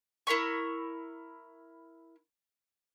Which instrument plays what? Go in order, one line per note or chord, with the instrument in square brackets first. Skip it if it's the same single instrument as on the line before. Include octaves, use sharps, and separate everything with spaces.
[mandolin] E4 A#4 B5 C#6